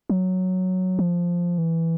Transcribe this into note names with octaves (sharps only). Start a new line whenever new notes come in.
F#3
F3
E3